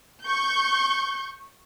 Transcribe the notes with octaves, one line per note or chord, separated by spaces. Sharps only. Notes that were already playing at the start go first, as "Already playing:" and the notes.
C#6 G6